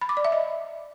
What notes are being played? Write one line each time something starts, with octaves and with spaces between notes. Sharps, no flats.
B5
D6
D5
E5
D#5